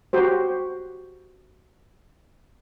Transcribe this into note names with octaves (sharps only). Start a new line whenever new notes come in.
F#4 G4 C5